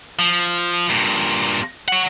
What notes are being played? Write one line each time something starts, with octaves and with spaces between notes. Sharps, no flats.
F3
G2 A#2
C#5 F#5